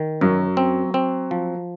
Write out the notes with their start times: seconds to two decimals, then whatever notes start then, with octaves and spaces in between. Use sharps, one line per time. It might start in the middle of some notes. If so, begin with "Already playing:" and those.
Already playing: D#3
0.21 F#2 F#3
0.57 C4
0.94 C4
1.31 F3